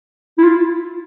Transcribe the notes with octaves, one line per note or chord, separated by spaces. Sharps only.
E4
F4